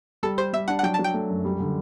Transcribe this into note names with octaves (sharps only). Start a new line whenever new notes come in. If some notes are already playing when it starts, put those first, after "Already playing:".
G3 A4
G4 C5
G3 E5
D4 F#5
F#5
F#3 G5
A5
F#3
G5
A3
F#2
G3
D3